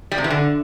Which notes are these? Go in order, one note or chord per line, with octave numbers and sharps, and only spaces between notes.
G3
C3
E3
D3